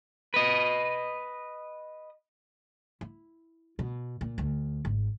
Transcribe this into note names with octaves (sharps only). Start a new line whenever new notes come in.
B4 D#5
E4
B2
A#2
D2
G#1